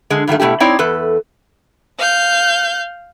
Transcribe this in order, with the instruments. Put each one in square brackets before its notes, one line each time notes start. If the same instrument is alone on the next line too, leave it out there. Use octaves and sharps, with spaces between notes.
[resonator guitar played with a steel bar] D3 G#3
G2 D#3 F#3 A3
B2 A3 E4 G4
C4 D#4 E4 C#5 D5
E2 A4 B4
[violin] F5 G6